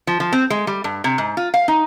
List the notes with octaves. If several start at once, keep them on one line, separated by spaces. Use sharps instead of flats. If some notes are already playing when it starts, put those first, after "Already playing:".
F3
F3
C4
G#3
G3
G2
C3
G#2
F4
F5
D#4